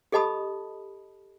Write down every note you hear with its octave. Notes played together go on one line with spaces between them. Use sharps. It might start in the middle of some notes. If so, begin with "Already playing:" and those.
G4 A4 D#5 A5 B5 D#6